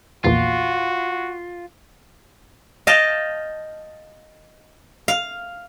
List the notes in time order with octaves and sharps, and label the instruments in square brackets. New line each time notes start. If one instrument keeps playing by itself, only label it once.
[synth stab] A#1 E2 A#2 [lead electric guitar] F4 [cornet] F#4
[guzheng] D#5 F5 G5 A5
F5